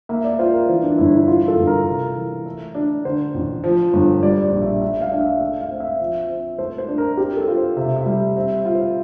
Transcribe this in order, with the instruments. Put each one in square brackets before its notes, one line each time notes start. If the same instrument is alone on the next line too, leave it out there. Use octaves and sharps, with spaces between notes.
[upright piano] A#3 [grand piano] E5
[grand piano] D5
[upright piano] F4 [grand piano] C5
[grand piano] A#4
[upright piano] E3 [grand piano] C5
[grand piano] D4
[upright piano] G1 [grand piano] E4
[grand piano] E4
[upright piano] E3 [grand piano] F4
[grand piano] A4
[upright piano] G1
[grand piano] A#4
[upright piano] C3 [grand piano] A#4
[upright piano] E3
A3
D4
[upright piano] D3 [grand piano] C5
[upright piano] A1
F3
G1
[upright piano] G3 [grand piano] D5
[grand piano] D5
[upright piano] A#1
[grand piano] E5
[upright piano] A3 [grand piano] E5
[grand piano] F5
[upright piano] D4
[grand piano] E5
[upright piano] A3 [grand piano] E5
[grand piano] F5
[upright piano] C4
[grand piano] E5
[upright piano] F3
C4
[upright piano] A3 [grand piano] C5
[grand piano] C5
[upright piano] D4
[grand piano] A#4
[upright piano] C4 [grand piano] G4
[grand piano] A4
[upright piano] F4
[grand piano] C5
[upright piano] C3 [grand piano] E5
[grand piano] E5
[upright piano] G3
[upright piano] C4 [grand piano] E5
[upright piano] F4
[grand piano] C5